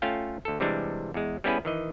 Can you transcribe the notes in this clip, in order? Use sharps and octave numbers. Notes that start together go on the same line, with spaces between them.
A3 C#4 F4 F5 G5
D2 A4
C3 E3 G3 G#3 D4
E2 G#3
G3 B3 C#4 E4 G#4 B4
D#3 E3 D#5